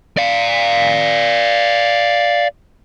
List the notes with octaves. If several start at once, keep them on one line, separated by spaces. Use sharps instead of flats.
D5 F5